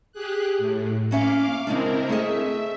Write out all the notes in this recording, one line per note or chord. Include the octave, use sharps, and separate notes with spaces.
G4 G#4 F#6
A2
A#3 C#4 E5 F5 D6
C#3 G#3 C4 D4 E4 A#4
A3 G#4 D#5 E5